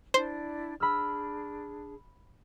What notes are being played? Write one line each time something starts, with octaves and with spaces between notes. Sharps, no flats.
D4 E4 C5 D5
D4 G#4 B5 E6 F6